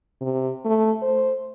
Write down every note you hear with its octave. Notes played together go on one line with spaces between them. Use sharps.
C3
A3
C5